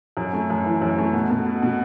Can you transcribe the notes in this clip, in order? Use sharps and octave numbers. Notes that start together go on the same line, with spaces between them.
F#2
A3
F#2
E3
F#2
A3
B2
B2
B2
B2